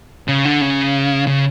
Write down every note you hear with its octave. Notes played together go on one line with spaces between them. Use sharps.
C#3
D3
C#3
C#3